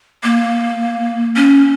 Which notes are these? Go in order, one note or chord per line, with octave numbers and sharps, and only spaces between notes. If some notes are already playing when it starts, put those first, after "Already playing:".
A#3
C#4